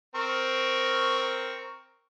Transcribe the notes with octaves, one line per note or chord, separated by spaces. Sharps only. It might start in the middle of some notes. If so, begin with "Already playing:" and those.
C4 A#4 C#6